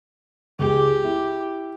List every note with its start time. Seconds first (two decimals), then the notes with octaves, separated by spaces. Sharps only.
0.59 C#2 G4 G#4
1.04 E4